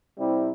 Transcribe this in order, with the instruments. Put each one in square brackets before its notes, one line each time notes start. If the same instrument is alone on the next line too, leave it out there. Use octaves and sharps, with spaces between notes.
[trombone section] C3 G3 C4 E4